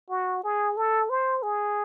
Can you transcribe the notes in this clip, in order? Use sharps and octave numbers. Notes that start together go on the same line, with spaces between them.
F#4
G#4
A4
C5
G#4